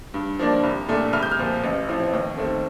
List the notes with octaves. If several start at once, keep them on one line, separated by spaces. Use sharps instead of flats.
G2
F3 A#3 D4
C2
A#2 A3 D4
C2 F6
G6
F6
A#2 F3
A1
A2 F3 C4
D#2
D#3 A3 C4